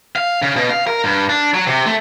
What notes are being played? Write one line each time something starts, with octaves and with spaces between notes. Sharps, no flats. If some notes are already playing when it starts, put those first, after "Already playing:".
F5
C#3
B2
F5
A#4
G2
D4
F#3
C3
A3